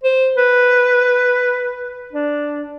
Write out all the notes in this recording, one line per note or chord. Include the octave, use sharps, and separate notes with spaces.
C5
B4
D4